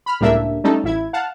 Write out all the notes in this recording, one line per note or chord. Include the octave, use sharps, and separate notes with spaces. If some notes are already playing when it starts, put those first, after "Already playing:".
B5 F6
C#2 A2 G3 A#3 D4 E5
G3 A3 C#4 D#4 A4
A1 E4 G#6
F5 F#5 A5